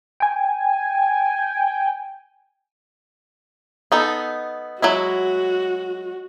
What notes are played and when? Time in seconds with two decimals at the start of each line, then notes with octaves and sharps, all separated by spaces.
0.20 G5 G#5
3.92 B3 D#4 A4
4.82 F#3 G#3 E4 F#4